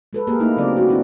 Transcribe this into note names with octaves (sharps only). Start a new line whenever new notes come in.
G#3 A4 B4
A#3 G4 G#4 A#4
A3 A#3 D#4 E4
C#3 F#3 C4 E4 D5
C#4 F4 F#4
C4 D4 E4